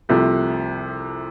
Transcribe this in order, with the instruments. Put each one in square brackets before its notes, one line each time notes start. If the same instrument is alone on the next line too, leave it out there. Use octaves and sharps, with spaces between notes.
[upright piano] C2 C3 F3 A3